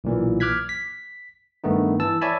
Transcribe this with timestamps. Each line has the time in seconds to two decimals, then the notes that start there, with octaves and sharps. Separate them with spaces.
0.04 B1 A#2 E3
0.40 D6 F6 F#6 G#6 B6
0.69 B6
1.64 G2 D#3 A3 B3 D#4
2.00 E3 A5 E6
2.21 C#5 D5 E5 G#5 A5 B5